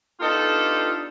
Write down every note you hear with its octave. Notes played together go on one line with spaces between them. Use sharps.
B3 D4 D#4 F4 G4 A4